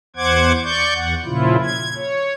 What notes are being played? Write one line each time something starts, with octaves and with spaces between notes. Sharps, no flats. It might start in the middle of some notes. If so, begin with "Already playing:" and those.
E2 C5 F#5 D6 G#6
D5 C#6 G6
E2 F#5
A#2 C#3 F3 E4 F4
G#6
C#5